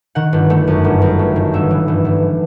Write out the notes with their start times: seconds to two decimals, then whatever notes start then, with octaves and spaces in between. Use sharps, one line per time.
0.15 D#3 F#5
0.33 G1
0.50 A3
0.67 F#2
0.84 G1
1.02 F#2
1.19 A3
1.36 D#3
1.53 G1 E5
1.71 E3
1.88 G1
2.05 G1